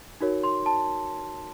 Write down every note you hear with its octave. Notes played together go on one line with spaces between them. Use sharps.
D#4 F#4 A#4 C#5
C6
A5